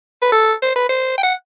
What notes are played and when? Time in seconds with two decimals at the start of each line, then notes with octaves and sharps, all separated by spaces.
0.22 B4
0.32 A4
0.62 C5
0.76 B4
0.89 C5
1.18 G5
1.23 F#5